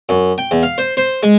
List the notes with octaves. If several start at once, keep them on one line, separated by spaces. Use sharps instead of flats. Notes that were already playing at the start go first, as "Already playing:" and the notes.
F#2
G5
E2
F5
C5
C5
G#3